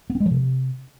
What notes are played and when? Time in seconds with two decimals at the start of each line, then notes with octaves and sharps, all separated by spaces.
0.10 B3
0.15 C4
0.20 G#3
0.26 F3
0.31 C3